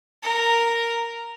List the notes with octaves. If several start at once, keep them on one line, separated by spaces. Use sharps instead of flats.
A#4